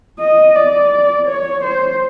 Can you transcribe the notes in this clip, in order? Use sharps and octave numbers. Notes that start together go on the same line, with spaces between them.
D#5
D5
C#5
C5